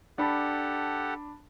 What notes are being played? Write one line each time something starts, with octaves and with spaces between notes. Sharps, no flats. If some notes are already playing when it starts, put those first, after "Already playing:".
D4 G4 A4 F#5 A5 B5